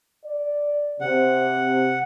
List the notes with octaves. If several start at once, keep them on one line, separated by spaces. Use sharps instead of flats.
D5
C3 F#5